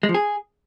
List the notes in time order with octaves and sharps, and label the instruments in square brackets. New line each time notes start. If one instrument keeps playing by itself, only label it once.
[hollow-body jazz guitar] G#3
F3
G#4